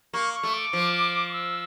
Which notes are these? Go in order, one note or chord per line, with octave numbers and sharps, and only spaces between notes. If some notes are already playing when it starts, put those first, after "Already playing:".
A#3 C#6
C#6
A3
D6
F3
D6
E6